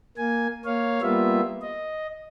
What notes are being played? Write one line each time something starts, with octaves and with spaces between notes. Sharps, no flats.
A#3 G#5
A#3 C#5 F5
G3 A#3 B3 F4 E5
D#5